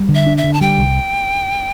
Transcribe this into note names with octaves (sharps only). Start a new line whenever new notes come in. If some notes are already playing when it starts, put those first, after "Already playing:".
Already playing: G3
D3
E5
D4
E5
D3
A5
G3 G5
C2